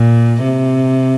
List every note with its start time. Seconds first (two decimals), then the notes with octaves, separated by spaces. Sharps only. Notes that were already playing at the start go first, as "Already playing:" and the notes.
Already playing: A#2
0.43 C3